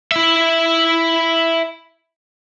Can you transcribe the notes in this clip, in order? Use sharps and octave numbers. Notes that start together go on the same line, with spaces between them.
E4 E5